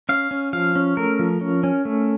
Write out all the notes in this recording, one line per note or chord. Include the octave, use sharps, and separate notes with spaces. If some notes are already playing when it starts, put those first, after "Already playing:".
C#4 F5
C#4
F3 F5
C#4
A3 A#4
F3
C#4
C#4
A3